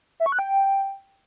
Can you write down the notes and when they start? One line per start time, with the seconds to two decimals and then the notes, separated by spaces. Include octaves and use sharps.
0.20 E5
0.26 C#6
0.32 F#6
0.39 G5